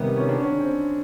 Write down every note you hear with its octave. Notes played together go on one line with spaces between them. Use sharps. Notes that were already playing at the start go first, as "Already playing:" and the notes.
Already playing: C3 D#3 G3 B3 D#4
C#4
D4
C#4
C4